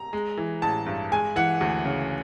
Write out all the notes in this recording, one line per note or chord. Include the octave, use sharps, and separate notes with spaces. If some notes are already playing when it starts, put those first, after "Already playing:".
Already playing: A#5
G#3
E3
A1 A5
G2
G#3 G#5
E3 F#5
D2
C#3